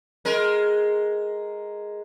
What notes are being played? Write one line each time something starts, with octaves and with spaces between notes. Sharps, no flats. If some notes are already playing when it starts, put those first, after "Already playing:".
G#3 A#4